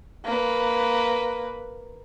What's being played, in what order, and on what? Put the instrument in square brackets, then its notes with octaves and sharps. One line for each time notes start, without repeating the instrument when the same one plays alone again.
[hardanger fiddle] A#3 B4